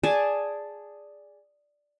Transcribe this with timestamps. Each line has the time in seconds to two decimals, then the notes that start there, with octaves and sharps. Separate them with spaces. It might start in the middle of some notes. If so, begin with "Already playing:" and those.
0.03 G#4 D5 G#5 A5